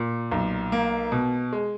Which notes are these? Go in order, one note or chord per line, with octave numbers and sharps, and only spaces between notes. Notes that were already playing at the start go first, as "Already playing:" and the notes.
Already playing: A#2
B1
A#3
B2
G#3